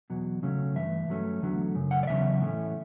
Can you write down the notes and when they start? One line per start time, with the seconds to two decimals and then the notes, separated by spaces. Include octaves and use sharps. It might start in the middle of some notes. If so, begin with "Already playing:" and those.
0.10 E2 B2 F#3
0.43 C#3 F#3 A3 C#4
0.76 G2 E3 A3 E5
1.08 G2 F#3 A3 C#4
1.42 E2 D3 F#3 A3
1.75 F#2 C#3
1.91 F#5
2.03 D5
2.07 E2 C#3 F#3 C#4 E5
2.41 A2 E3 A3 C#4